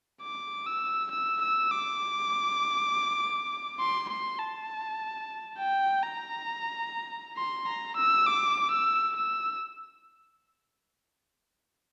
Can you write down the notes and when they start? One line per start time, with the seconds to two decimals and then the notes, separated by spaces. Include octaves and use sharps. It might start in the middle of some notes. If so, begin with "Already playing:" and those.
0.22 D6
0.66 E6
1.11 E6
1.41 E6
1.71 D6
3.79 C6
4.09 C6
4.39 A5
5.59 G5
6.03 A#5
7.37 C6
7.66 A#5
7.97 E6
8.26 D6
8.71 E6
9.16 E6